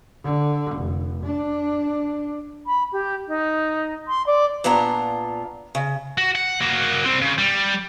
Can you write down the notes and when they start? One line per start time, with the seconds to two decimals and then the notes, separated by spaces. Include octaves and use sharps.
0.24 D3
0.76 F1
1.23 D4
2.66 B5
2.92 G4
3.27 D#4
4.07 C6
4.26 D5
4.64 A#2 B3 D4 F4 A#5
5.75 C#3
6.18 F#4
6.35 F#5
6.61 A#3 F#4
7.05 G3 C4
7.21 C#3
7.38 G3